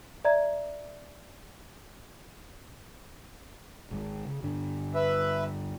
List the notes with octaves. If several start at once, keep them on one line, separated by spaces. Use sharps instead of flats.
D5 E5 A#5 G#6
G#1 D#3 G#3
C#3
G2 D3 D4
B4 E5